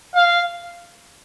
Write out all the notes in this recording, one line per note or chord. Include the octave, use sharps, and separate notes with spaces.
F5